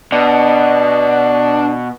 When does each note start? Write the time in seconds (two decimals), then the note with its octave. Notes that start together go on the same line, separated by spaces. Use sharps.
0.12 B2 D4